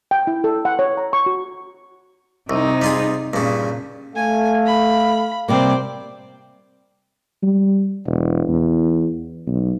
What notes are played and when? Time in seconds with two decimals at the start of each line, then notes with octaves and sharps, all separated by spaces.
0.11 G5
0.27 E4
0.44 A4
0.65 F#5
0.79 C#5
0.97 A#5
1.13 C#6
1.26 F#4
2.50 C2 C3 D#4
2.82 G3 F4 G#4
3.33 G2 A#2 C#3
4.16 A3 A4 F5 G#5
4.66 B5
5.48 C3 G3 A#3 C5 D5
7.43 G3
8.06 E1
8.49 E2
9.47 B1